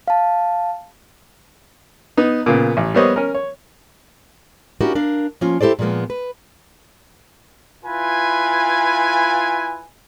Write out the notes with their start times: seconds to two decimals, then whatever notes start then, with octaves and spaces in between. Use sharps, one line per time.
0.08 F5 A5
2.17 B3 D#4
2.46 A#2 C#3 B3
2.77 A1
2.94 G3 A#3 B3 C5 C#5 D#5
3.16 C#4 A#4
3.34 C#5
4.81 C#4 D4 E4 F#4 G4 A#4
4.95 D4 A#4 F5
5.41 F3 A#3 C#4 F4
5.61 E4 G4 A4 C5 D5
5.79 A#2 F3 G#3 A#3 B3
6.10 B4
7.85 E4 F4 B4 G#5